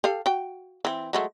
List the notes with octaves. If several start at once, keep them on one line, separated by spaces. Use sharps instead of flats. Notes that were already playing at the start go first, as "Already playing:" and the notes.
G4 A4 F5
F#4 G5
E3 C4
F#3 G#3 A3